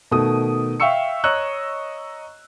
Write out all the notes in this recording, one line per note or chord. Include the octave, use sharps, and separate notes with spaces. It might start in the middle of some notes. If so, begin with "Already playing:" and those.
B2 D#3 A3 D#6
E5 F5 G5 C#6 E6 C#7
C#5 D#5 A#5 C#6 E6 F#6